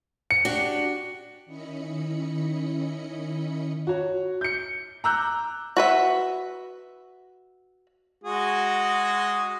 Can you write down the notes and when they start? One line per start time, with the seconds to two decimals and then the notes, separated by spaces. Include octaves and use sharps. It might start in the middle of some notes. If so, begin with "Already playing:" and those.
0.31 C#7
0.45 D4 F#4 G4
1.46 D#3 C#4 E4 D#5 B5 C#7
3.87 F#4 C#5
4.41 G6 C#7
5.04 A#5 D6 E6 F#6 G6
5.77 F#4 B4 E5
8.24 G#3 F#4 G#4